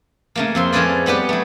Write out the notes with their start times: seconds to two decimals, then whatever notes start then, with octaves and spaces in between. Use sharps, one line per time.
0.36 C#3 A3 A#3
0.55 F2 C4 C6
0.72 F3 G#3 C#4 G#4 B4 D5
1.06 G3 B3 G4 B4
1.29 F#3 A3